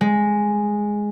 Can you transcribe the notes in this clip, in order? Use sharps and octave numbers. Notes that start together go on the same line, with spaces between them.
G#3